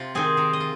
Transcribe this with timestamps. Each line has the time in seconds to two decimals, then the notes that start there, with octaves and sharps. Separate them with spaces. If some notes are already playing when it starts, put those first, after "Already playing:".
Already playing: C3 F4
0.15 D#3 C4 G#4
0.37 D#3 A#4
0.53 D#5
0.60 F4